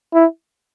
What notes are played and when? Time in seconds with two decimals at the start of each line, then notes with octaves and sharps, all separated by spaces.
0.14 E4